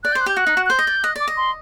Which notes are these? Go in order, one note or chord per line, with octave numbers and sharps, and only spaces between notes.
D5 F#6
G6
C5
F#6
G4 G6
F#4 F#6
D#4
F#4
F#6
C5 G6
D#5
D5
D#5 F#6
D5 D6
D#5
C6